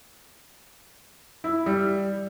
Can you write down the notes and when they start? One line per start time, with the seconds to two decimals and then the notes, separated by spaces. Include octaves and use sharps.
1.44 E4
1.66 G3